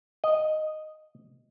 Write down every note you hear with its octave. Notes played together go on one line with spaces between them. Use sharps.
D#5